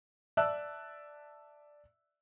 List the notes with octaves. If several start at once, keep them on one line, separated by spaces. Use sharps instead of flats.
D5 E5 A5 E6 F#6